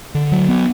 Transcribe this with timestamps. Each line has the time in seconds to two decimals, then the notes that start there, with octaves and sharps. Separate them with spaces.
0.15 D3
0.32 F#3
0.49 B3